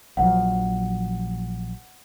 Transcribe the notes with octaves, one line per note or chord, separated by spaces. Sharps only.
A#1 F3 F#3 F#5